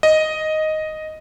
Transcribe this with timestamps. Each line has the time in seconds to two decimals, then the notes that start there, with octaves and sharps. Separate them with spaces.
0.03 D#5